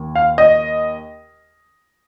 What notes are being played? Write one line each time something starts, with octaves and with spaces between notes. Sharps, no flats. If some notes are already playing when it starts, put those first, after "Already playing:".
Already playing: D#2
F5
D#5